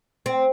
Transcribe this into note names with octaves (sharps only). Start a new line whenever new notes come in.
C4